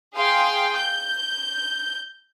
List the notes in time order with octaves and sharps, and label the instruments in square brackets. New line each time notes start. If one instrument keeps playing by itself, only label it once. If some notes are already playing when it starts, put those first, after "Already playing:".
[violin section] G#4 F5 G5 C6
G6